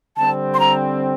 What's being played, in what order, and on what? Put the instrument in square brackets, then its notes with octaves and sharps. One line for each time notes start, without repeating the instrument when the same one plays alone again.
[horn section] D3 G3 C4 [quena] A5
[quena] C6
A#5